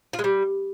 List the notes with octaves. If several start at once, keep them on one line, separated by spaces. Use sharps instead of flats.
F4
G#3
G3